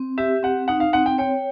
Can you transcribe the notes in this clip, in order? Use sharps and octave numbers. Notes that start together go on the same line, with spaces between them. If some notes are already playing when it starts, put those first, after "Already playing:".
Already playing: C4
G4 E5
C4 F#5
D#4 F#5
F5
C4 F#5
G5
C#5 G5